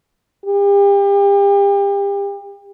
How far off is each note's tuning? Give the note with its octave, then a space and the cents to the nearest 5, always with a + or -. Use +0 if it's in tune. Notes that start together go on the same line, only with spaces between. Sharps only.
G4 +35